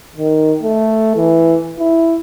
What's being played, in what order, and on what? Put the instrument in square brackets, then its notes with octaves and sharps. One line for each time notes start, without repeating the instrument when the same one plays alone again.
[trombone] D#3
A3
E3
E4